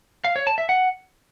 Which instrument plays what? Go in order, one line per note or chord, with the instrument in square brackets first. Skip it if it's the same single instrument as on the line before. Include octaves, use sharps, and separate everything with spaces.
[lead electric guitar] F5
C#5
A5
E5
F#5